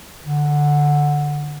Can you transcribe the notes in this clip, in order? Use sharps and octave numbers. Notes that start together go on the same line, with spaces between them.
D3